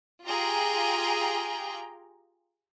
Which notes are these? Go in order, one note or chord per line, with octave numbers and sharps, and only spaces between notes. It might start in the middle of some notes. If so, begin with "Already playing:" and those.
F4 G4 G#4 G5 A#5